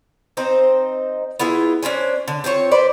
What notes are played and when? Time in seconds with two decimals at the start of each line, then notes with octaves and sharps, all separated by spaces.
0.37 C4 D#4 C5
1.39 B3 E4 F4 G#4
1.83 C#4 D4 C5 G#5
2.28 D3
2.44 C4 F4 G#4 C#5
2.71 B4 C5 D5